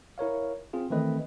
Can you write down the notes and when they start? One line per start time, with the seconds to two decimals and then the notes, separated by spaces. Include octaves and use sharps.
0.18 E4 A#4 C#5 F5
0.73 C4 F4 G#4 F5
0.90 D#3 E3 A3 C4 B4 D#5